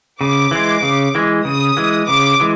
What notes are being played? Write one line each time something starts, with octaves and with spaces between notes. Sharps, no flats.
C#3 D6
E3 G#3
C#3
E3 G#3
C#3 D#6
E3 G#3
C#3 D6
E3 G#3